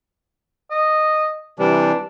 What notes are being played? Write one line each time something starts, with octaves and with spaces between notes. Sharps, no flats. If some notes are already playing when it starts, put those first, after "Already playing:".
D#5
C3 E3 G3 D4